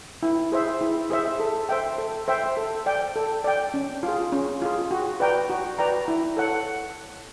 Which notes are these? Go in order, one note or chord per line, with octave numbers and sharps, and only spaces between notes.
E4
G#4 C5 E5
E4
G#4 C5 E5
A4
C5 E5 G5
A4
C5 E5 G5
A4
D5 G5
A4
D5 G5
C#4
F4
G#4
C#4
F4 G#4
F#4
B4 D5 G5 A#5
F#4
B4 D5 G5 A#5
E4
A4 C#5 F#5